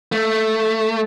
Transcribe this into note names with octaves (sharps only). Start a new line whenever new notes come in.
A3